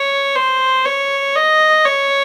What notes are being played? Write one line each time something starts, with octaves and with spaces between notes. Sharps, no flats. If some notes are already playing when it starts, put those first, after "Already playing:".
Already playing: C#5
C5
C#5
D#5
C#5